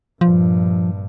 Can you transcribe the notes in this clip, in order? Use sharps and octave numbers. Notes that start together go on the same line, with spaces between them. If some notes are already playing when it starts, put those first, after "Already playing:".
A#1 G2 F3